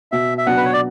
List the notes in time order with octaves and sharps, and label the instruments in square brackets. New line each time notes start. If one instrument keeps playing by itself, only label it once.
[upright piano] B2 [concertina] E5
[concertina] E5
[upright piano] F#3 B3 D4 [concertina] F#5
[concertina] B4
C#5
D5